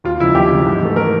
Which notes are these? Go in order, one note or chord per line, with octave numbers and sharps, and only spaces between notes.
D#2 F4
C#3 F3 G#3 E4
D#2 G4
C#3 F3 G#3
G#2
E3 A3
A#4